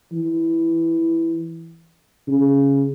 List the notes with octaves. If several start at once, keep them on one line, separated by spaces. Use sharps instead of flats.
E3
C#3